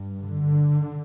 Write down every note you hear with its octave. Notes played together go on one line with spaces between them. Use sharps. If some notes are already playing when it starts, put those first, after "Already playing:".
Already playing: G2
D3